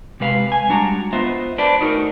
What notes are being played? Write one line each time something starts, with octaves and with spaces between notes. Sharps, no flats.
C3 G#3 B4 F5
G#5
G3 G#3 D4 F#4 A#5
B3 F4 B4 C5 D#5 E5
D4 B4 C5 D5
A3 D#4 F#4 A#4